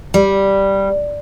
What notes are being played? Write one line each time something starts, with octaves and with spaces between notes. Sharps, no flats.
G3